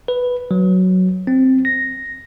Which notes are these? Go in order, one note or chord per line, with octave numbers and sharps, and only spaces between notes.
B4
F#3
C4
A#6